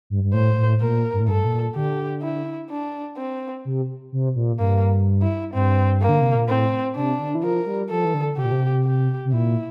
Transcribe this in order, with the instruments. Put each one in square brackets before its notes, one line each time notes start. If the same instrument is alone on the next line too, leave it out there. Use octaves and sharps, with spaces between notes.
[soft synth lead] G2
G2
[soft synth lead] A2 [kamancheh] C5
[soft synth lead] A2
[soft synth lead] A#2 [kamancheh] A#4
[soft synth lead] G2
A2
[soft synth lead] G2 [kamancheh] A4
[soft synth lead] A#2
[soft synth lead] D3 [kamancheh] G4
[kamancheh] E4
D4
C4
[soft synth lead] C3
C3
A#2
[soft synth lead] G2 [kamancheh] A#3
[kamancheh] E4
[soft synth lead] G2 [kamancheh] C4
[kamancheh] A#3
[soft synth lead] D3
C3
A#2
[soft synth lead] A2 [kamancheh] C4
[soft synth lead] C3 [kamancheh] D4
[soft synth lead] D3
E3
[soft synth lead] F3 [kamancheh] A#4
[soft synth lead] G3
[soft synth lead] F3 [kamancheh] A4
[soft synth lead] E3
D3
[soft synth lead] C3 [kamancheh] G4
[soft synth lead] A#2
C3
[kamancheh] G4
[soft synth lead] C3
[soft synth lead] A#2 [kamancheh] E4